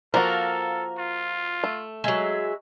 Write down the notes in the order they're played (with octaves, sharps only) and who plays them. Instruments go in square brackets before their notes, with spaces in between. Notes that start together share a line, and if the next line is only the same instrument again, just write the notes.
[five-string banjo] F3 A#3 F#4 [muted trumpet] A4 [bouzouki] A#4
[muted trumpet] F4
[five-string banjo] A3
[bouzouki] F#3 G#3 [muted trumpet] E5